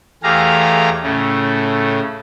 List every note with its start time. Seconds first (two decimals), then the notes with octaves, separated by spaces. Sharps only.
0.23 E2 A3 G4 G#4 F5 A#5
1.03 A2 C#3 A3